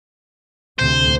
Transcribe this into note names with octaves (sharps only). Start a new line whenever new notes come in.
D2 C3 C5